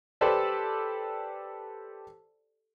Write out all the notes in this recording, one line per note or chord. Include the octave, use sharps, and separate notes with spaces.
G4 A4 B4 C5 D5